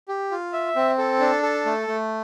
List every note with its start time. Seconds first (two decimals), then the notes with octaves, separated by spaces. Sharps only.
0.08 G4
0.31 F4
0.53 E5
0.76 C4
0.98 A4
1.20 D4
1.43 A4
1.66 A3
1.87 A3